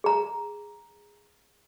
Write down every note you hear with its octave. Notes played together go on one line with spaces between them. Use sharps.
G#4 A#5